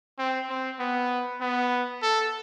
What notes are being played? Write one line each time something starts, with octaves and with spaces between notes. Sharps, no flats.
C4
C4
B3
B3
A4